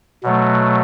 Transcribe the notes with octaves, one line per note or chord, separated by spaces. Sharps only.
B2 F#3 A3